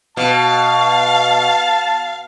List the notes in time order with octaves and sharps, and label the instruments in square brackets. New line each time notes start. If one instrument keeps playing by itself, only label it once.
[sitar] B2 [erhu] F5 [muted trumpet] A5